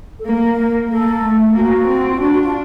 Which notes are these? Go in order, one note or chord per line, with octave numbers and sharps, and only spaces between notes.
A4
A#3 A#4
A#3
A#3 A4
A3
A#3 F#4
C4
F4
D4 F#4
F#4
F4